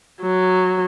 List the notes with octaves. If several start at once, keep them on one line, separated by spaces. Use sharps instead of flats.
F#3